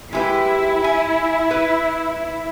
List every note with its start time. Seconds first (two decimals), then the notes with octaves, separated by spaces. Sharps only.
0.13 G#3 E4 G4 B4
0.84 G#5
1.51 B4